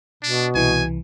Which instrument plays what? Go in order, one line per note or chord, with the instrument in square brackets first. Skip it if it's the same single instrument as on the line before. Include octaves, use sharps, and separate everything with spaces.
[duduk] B2 [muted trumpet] D4
[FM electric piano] C2 E3 [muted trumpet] G#5